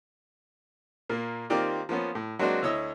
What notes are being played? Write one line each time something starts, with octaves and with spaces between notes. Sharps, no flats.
A#2 A#3
D#3 A#3 C4 F4 G4 D5
F3 A#3 B3 C#4
A2
F#3 G#3 A#3 C4 D4 F#4
D2 E4 C#5 D#5 E6